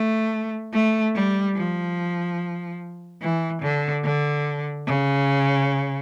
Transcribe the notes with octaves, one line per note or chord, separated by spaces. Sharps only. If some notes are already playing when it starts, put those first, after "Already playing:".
Already playing: A3
A3
G3
F3
E3
D3
D3
C#3